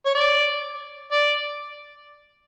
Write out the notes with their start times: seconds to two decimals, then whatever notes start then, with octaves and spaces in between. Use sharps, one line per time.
0.05 C#5
0.15 D5
1.12 D5